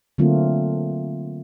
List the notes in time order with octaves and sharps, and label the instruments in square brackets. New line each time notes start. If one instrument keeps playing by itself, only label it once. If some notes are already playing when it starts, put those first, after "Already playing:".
[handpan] D3 F#3 A3 A#3 C4 F4